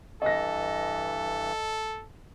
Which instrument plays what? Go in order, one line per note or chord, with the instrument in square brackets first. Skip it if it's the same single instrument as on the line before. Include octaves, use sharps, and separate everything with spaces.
[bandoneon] G2 E3 [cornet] A4 [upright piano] D#5 A#6